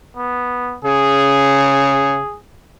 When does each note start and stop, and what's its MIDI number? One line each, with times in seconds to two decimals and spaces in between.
0.17 0.77 59
0.85 2.20 49
0.85 2.37 68